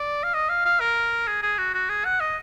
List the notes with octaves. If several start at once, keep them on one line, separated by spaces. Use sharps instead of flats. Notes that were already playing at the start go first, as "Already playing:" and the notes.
Already playing: D5
F5
D#5
F5
F5
A#4
G#4
G#4
F#4
F#4
G#4
F#5
D#5